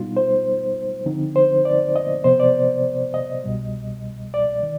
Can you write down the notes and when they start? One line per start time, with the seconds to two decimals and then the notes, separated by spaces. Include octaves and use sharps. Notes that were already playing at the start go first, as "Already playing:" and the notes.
Already playing: B2 G3 B3 D#4 F4
0.17 C5
1.06 D3 F3 C4 D#4
1.36 C5
1.65 D5
1.96 D#5
2.24 C3 F3 B3 C5
2.40 D5
3.14 D#5
3.44 C2 B2 G3
4.34 D5
4.63 D#3